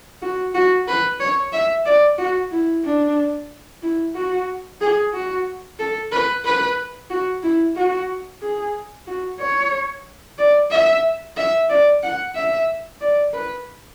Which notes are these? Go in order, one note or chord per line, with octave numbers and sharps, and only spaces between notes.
F#4
F#4
B4
C#5
E5
D5
F#4
E4
D4
E4
F#4
G#4
F#4
A4
B4
B4
F#4
E4
F#4
G#4
F#4
C#5
D5
E5
E5
D5
F#5
E5
D5
B4